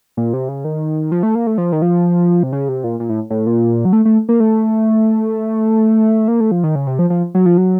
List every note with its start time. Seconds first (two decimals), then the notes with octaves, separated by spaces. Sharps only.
0.17 A#2
0.34 C3
0.49 C#3
0.65 D#3
1.12 F3
1.23 A3
1.35 A#3
1.47 A3
1.58 F3
1.72 D#3
1.82 F3
2.43 C3
2.53 C#3
2.69 C3
2.84 A#2
3.00 A#2
3.09 A2
3.30 A2
3.47 A#2
3.85 F#3
3.93 A3
4.05 A3
4.29 A#3
4.40 A3
6.28 A#3
6.40 A3
6.51 F3
6.64 D#3
6.75 C#3
6.87 C3
6.99 F3
7.10 F3
7.35 F#3
7.46 F3
7.57 F#3